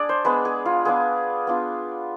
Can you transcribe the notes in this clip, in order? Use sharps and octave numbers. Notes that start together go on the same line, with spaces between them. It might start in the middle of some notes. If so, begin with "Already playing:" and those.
Already playing: D4 G#4 D5
C5
G#3 B3 D4 B4
G#4
F4
B3 D4 F4 G#4
B3 D4 F4